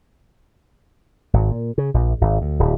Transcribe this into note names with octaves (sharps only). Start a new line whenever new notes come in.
G#1
A#2
C#3
A#1
G#1
D2
D1